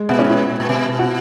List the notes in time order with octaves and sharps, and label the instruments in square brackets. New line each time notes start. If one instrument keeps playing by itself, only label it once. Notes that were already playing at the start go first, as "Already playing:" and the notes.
Already playing: [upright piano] G#3
[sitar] B2 [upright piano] B3
[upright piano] C#4
[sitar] A#2 [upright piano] E4
[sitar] A#2
B2
[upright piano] F#4